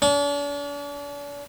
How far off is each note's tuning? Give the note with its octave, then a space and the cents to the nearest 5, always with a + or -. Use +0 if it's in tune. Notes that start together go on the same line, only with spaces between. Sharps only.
D4 -45